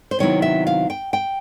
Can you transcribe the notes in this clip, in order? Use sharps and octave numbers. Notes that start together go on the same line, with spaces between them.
C5
C3 D#3 F#3 B3 E4 C#5
E5
F5
G5
G5